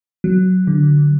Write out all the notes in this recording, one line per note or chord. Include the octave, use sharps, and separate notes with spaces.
F#3
D3